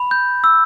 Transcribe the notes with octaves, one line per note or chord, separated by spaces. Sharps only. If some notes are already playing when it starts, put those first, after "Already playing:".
Already playing: B5
G6
E6